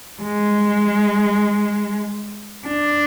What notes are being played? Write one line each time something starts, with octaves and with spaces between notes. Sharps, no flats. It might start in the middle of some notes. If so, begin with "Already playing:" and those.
G#3
D4